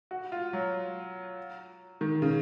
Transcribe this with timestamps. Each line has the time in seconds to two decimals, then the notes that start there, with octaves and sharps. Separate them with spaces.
0.11 F#4
0.32 F4
0.53 F#3
2.01 D#3
2.22 C#3